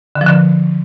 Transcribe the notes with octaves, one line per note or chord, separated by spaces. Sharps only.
D3
F3
D3